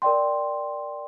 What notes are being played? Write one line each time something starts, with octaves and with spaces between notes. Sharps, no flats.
A#4 D5 G5 C6